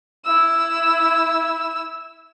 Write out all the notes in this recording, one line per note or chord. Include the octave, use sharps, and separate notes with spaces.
E4 E6